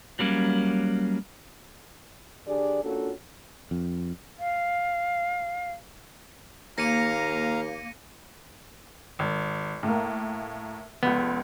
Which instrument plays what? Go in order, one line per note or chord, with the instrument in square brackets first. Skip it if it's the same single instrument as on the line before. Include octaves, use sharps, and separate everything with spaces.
[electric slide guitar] F#3 G3 A#3 C#4
[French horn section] D3 D4 G4 G#4 D5
A#3 C#4 D4 F4 F#4 A4
[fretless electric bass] F2
[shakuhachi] F5
[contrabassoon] D#2 [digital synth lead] A#3 [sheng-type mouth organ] F5 A#5 [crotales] A#6 C#7 D#7
[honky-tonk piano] G#1
A2 A#3
[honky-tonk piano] F1 C#2 [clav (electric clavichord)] B3